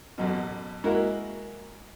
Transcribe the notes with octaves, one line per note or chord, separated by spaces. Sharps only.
A1 F#2 B2
G#3 A#3 E4 F#4 A#4